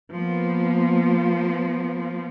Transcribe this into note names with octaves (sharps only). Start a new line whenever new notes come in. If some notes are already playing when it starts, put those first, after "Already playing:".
F3 A#3 B3